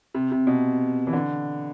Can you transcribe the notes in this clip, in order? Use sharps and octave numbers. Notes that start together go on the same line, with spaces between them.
C3
C3
B2
E3
D3